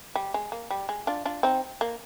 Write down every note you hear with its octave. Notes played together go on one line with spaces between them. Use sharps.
G3
G#3
A#3
G3
G#3
D4 F4
D4 F4
C4 D#4
A#3